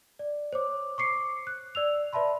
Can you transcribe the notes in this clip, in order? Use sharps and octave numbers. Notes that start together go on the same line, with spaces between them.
D5
C5 C#5 D6
C#6 D6 C7 C#7
F#6
D5 E6 F7
B4 D5 E5 A5 B5 C6